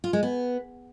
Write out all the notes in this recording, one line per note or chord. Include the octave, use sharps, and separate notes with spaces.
F4
G#3
B3